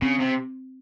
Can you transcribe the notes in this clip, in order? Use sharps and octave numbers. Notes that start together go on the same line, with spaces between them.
C#3 C4
C3